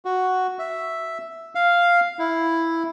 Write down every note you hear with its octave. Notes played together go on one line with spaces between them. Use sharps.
F#4
E5
F5
E4